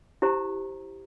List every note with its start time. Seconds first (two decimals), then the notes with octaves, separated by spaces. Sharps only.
0.22 E4 G4 C5 A#5